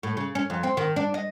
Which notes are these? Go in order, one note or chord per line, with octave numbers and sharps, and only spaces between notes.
A2
C#3
C#4
F2
C4
D#3
D4
D#5